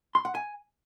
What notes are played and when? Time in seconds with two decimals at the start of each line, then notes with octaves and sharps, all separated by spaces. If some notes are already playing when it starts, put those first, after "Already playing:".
0.15 C6
0.25 F#5
0.35 G#5